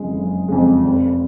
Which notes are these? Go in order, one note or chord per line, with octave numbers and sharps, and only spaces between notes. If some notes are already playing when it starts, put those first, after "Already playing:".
Already playing: F#1 F2 C#3 G#3
F#1
F2 C#3 G#3
F1